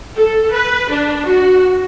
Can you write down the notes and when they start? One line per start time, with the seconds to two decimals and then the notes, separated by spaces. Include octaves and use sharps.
0.16 A4
0.51 B4
0.89 D4
1.25 F#4